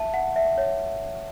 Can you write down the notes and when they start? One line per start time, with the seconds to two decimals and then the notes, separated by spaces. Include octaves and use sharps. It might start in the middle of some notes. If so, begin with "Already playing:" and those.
Already playing: E5 A5
0.14 F#5
0.36 E5
0.58 C#5